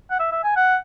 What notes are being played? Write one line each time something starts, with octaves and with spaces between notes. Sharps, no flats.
F#5
E5
E5
G#5
F#5